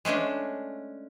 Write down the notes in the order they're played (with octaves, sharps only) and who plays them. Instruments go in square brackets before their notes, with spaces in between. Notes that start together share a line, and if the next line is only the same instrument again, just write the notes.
[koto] G#3 A3 C#4 D4